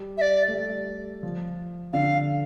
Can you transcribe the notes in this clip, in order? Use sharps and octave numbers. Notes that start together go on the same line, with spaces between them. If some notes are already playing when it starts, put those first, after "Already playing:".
Already playing: G3
E5
D5
A3
G3
F3
D3 F5